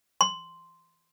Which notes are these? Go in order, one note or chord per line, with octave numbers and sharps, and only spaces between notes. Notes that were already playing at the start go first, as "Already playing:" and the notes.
C6